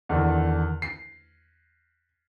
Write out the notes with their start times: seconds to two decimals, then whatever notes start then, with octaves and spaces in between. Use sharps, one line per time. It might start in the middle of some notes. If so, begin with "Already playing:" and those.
0.09 E2 D3 D#3
0.82 C7